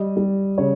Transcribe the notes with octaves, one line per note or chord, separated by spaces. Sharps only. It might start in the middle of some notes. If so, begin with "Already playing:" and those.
Already playing: G3 D#5
G3
C#3 C#5